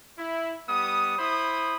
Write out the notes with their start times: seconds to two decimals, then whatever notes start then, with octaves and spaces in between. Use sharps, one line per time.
0.18 E4
0.69 G3 B3 D#6
1.19 E4 C5 B5 D#6